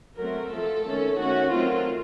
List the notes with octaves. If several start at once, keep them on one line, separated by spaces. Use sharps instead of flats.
F#3 A3 C4 A#4
F3 A3 C4 A4
D#3 A3 C#4
D#3 A3 C#4 F#4
D#3 F#3 A3 C4 F4